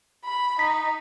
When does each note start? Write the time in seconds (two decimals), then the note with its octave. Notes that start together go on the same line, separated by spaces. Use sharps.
0.24 B5
0.59 D#4 B6